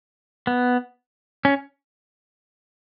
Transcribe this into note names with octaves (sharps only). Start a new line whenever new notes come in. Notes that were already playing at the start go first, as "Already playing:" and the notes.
B3
C#4